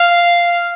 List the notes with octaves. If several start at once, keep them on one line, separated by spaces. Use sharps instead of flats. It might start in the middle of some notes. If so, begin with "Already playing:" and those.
Already playing: F5